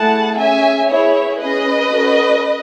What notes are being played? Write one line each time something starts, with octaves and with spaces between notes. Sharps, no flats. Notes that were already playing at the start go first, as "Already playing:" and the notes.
Already playing: A3 E4 G#4 F#5 A5
C#4 G#4 E5 G#5
B3 E4 G#4 C#5 E5
C#4 G#4 B4 D#5
C#4 F#4 A4